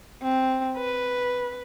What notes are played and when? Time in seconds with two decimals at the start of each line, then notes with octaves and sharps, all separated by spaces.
0.22 C4
0.77 B4